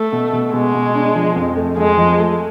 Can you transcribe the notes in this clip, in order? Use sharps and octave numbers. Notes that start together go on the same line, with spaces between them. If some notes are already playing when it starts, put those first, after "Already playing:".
Already playing: A3
B2
B2
B2 G#3
B2
D4
F3
F2
A3
F2 G#3
F3
A3